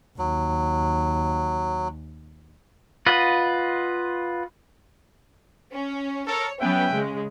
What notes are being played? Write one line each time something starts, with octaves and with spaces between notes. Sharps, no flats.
D#2 F#3
F4 B4 D#5 F#5
C#4
A4 A#4 C#5
F#3 B3 C#4 B4 E5 G5
C#3 G#3